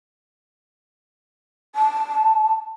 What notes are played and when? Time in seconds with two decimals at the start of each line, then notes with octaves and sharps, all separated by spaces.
1.75 A5